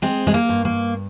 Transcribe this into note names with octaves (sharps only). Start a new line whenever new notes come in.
G#3 C4
G#3
A#3
G2
A#3